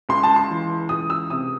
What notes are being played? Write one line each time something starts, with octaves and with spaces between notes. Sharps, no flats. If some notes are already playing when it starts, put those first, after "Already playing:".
C#2 C6
A5
C6
E3
C#2 D#6
E6
C3 D#6